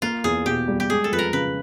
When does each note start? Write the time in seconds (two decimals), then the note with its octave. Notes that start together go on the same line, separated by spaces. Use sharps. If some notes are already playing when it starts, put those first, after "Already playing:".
0.02 A#3 F4
0.24 E2 G#4
0.46 B2 G4
0.68 G3
0.80 G4
0.90 G#3 G#4
1.04 A4
1.12 F2 B4
1.19 A#4
1.33 C#3 B4